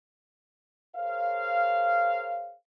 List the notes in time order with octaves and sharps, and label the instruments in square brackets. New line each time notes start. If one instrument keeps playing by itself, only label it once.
[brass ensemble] G#4 A#4 C5 C#5 F5